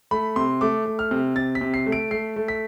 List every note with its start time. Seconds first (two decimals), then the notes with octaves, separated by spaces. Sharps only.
0.11 A3 B5
0.36 C3 C6
0.61 A3 D6
0.86 A3
0.99 F6
1.11 C3
1.36 C3 A6
1.55 B6
1.61 C3
1.74 C7
1.86 A3
1.92 D7
2.11 A3 C7
2.36 A3
2.48 B6